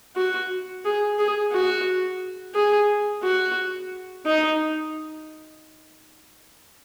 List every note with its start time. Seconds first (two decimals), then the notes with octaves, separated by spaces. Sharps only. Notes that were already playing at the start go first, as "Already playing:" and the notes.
0.16 F#4
0.85 G#4
1.18 G#4
1.53 F#4
2.54 G#4
3.23 F#4
4.25 D#4